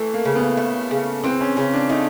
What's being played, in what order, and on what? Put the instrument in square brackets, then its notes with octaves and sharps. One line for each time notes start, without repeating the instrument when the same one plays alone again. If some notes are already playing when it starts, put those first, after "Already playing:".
Already playing: [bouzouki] E3 [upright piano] A3
[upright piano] A#3
[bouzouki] C#3
[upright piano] B3
[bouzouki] A3
C#3
[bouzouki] E3 [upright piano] C4
[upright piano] C#4
[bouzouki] C#3 [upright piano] C#4
[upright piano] D4
[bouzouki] A3 [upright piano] D#4